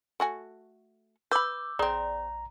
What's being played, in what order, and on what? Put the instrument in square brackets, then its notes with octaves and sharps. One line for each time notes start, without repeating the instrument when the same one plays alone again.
[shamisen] A3 F#4 G#5
[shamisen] B4 B5 [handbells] D6 E6 G6
[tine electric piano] A#1 A#5 [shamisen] C4 G#4 [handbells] D5